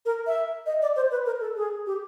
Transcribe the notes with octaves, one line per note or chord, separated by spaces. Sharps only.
A#4
E5
D#5
D5
C5
B4
A#4
A4
G#4
G4